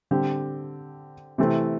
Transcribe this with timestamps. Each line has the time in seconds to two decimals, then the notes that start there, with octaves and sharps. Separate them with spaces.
0.11 D3 G3 C4 G4
1.38 C3 E3 A3 C4